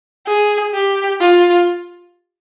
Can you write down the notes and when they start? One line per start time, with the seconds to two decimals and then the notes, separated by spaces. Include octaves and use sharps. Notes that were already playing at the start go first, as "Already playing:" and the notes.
0.27 G#4
0.74 G4
1.21 F4